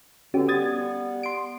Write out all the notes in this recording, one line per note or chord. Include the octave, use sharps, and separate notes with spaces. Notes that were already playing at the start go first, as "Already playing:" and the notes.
B2 D3 C#4 F#4 G4
G3 B3 D#6 G#6 A6
C6 D7